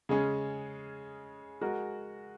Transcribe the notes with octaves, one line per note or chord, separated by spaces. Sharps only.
C#3 G#3 C#4 G#4
G#3 F#4 A#4